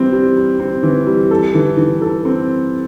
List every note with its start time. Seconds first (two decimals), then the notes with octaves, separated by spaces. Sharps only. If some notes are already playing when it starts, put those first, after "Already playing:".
Already playing: E3 G3 C4
0.12 G3
0.37 G3
0.60 C4
0.83 E3
1.07 G3
1.31 A4
1.54 E3
1.77 E3
2.02 A4
2.25 C4